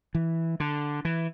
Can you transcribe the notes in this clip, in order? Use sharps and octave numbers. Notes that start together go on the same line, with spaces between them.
E3
D3
E3